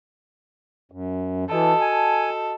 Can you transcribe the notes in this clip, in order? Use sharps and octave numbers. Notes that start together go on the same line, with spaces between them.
F#2
E3 F#4 A4 D#5 A5
G#5